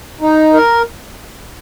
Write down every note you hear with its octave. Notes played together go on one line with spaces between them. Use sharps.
D#4
A#4